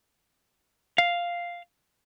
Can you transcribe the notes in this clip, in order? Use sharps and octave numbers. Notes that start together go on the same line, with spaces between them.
F5